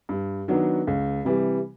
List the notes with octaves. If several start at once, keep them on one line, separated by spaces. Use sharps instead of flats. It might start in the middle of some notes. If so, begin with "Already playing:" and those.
G2
D#3 F#3 B3 D4
C#2
C3 E3 G3